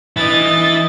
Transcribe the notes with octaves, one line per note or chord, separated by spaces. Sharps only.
E3 E4 D#5 A6